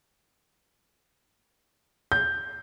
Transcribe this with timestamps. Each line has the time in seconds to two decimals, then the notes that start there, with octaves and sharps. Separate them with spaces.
2.12 G6